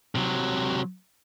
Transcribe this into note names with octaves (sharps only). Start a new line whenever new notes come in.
C3 F#3